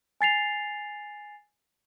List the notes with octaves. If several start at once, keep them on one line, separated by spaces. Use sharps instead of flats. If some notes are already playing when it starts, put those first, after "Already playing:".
G#5 A6 C7 F7